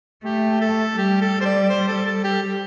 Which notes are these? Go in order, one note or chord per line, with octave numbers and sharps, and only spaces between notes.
A3 G4
A4
G3 G4
A4
C5
D5
C5
A4
A4
G4
G4